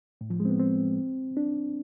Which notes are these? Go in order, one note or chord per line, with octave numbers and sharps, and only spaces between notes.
A2
F3
G#3
C4
B3
C4
D4